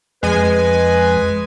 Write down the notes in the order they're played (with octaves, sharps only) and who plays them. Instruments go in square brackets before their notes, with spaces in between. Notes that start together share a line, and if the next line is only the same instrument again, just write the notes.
[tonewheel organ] F2 [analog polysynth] G#3 G#5 [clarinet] B4